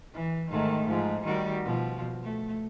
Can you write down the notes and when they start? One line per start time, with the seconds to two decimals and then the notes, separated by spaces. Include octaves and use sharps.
0.14 E3
0.50 G#2 D#3 A3
0.87 G#2 F3
1.24 D#3 G3 F#4
1.65 B2 F3
2.23 A3